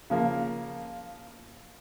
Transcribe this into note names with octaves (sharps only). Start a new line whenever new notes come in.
C#3 F3 A#3